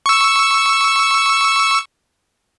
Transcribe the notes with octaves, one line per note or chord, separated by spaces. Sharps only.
C#6 E6